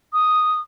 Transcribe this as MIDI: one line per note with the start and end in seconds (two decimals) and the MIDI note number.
0.13 0.61 87